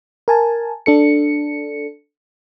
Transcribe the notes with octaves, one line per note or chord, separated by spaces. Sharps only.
A#4 G#5 A5
D4 A4 C#7